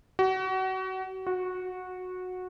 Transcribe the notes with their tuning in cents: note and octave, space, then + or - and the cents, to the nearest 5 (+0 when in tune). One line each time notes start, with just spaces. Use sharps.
F#4 +30
F#4 -15